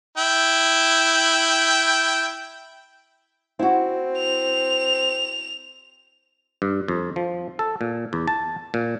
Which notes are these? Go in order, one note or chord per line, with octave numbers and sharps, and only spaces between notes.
E4 G5
C4 E4 F#4
F7
G2
F2
F3
A4
A#2
E2
A5
A#2